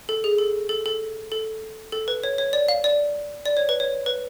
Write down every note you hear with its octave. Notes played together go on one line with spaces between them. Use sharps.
A4
G#4
A4
A4
A4
A4
A4
B4
C#5
C#5
D5
F5
D5
D5
C#5
B4
C#5
B4